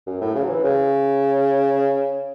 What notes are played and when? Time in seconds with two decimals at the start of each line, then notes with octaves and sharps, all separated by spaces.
0.07 F#2
0.21 A2
0.35 C#3
0.43 F#3
0.49 E3
0.63 C#3